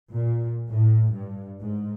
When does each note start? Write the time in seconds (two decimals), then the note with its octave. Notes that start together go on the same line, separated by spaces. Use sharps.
0.12 A#2
0.70 A2
1.13 G2
1.62 G#2